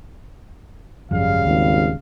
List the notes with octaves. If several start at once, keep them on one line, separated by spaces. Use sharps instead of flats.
G#1 F#2 C#3 F3 G3 F5
G#1 D#2